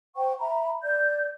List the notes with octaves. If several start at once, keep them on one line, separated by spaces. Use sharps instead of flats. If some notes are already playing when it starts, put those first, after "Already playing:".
C5 F#5 G5 C#6
E5 A#5 B5
D5 G6